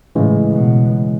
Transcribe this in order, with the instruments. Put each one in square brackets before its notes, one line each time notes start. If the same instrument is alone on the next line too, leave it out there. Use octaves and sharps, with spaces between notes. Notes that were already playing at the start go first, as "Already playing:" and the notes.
[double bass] A2 [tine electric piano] C#3 E3 G#3
[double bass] B2